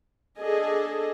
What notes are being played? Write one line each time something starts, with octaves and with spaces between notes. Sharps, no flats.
D4 G#4 A4 D#5